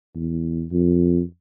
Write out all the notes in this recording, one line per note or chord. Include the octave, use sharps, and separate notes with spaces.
E2
F2